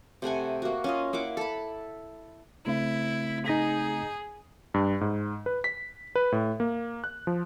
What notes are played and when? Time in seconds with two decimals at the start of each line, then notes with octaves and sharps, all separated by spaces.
0.22 C3 A3 F#5 G#5
0.62 A#3 F#4
0.84 C#4 F4 D#5
1.13 A#3 E4 F#5 D6
1.37 A4 B5
2.66 C#3 A3 C4 E4
3.46 D#4 G#4 A#6 B6
4.74 G2
5.01 G#2
5.46 B4
5.64 B6
6.15 B4
6.32 A2
6.60 A#3
7.04 F#6
7.27 F3